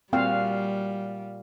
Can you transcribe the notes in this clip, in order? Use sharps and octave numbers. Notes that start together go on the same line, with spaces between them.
A#2 G3 C4 F4 F#4 F5